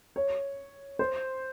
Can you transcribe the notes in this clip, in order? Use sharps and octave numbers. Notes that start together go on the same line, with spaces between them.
C#5
C5